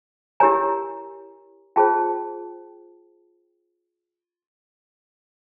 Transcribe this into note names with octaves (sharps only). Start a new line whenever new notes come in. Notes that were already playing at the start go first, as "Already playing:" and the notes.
E4 G4 A#4 C#5 G#5 A#5
F4 G#4 C5 G5 A5